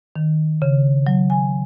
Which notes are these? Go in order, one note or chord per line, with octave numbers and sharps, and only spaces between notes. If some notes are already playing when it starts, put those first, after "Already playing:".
D#3
C#3
F#3
G#5